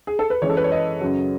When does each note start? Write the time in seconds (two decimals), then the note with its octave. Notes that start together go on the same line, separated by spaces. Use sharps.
0.07 G#4
0.19 A4
0.30 B4
0.42 F#2 E3 G#3 C#5
0.49 A4
0.57 B4
0.64 C#5
0.72 D#5
1.01 F#2 C#3 F#3